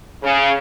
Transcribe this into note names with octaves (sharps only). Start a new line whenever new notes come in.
C#3